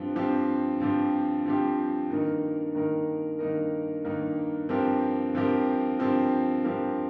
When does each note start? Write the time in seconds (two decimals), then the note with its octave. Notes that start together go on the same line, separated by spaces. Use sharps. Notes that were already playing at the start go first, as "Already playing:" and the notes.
Already playing: G2 F3 C4 G4
0.16 G2 F3 C4 G4
0.80 G2 F3 C4 G4
1.45 G2 F3 C4 G4
2.10 G2 D#3 A#3 D#4 A#4
2.74 G2 D#3 A#3 D#4 A#4
3.39 G2 D#3 A#3 D#4 A#4
4.04 G2 D#3 A#3 D#4 A#4
4.69 G2 F3 C4 G4 A#4
5.33 G2 F3 C4 G4 A#4
5.98 G2 F3 C4 G4 A#4
6.64 G2 F3 C4 G4 A#4